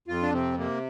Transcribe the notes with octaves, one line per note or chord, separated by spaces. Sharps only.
F2 F4
D4
C3 C4
C3 A#3